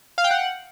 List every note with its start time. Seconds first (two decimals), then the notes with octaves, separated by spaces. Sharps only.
0.18 F5
0.24 G5
0.31 F#5